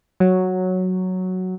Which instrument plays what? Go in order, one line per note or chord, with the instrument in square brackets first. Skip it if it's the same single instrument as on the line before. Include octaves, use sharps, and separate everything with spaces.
[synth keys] F#3